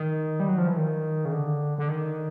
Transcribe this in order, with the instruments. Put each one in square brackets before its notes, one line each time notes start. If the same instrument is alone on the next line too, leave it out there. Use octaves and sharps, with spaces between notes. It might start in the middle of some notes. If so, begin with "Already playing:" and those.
Already playing: [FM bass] D#3
G3
F#3
F3
E3
D#3
C#3
D3
D3
D#3